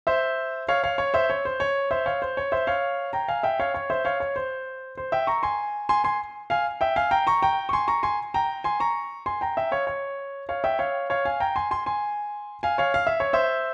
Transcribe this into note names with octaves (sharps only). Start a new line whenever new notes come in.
C5 E5
C#5 F5
C#5 F5
C#5
C5 E5
C#5
C5
C#5
C5 E5
C#5 F5
C5
C#5
C5 E5
C#5 F5
G5 A#5
F5 G#5
E5 G5
C#5 F5
C#5
C5 E5
C#5 F5
C#5
C5
C5
E5 G5
A#5 C#6
G#5 C6
G#5 C6
G#5 C6
F5 G#5
E5 G5
F5 G#5
G5 A#5
A#5 C#6
G5 A#5
C#6
G#5 C6
A#5 C#6
G#5 C6
G5 A#5
G#5 C6
A#5 C#6
G#5 C6
G5 A#5
E5 G5
C#5 F5
C#5
C#5 F5
E5 G5
C#5 F5
C#5 F5
F5 G#5
G5 A#5
G#5 C6
G#5 C6
G#5 C6
F5 G#5
C#5 F5
F5
E5
C#5
C5 E5